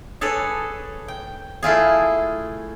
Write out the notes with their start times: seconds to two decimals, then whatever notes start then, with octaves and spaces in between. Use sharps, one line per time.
0.21 G#4 A4 B4 C#5 D5
1.08 G5
1.63 A3 E4 F4 G#4